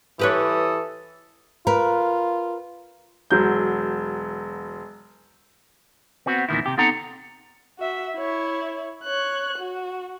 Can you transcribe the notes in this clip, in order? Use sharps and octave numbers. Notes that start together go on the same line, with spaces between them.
E3 G4 A4 B4 C#5 D#6
F4 A#4 B4
E1 F#3 G6
B3 C4 F#4
E2 A#2 D#3 E4
C3 G4
B3 C4 D#4 A4 F#5 A#5
F#4 E5
E4 C#5
C#5 F#6
F#4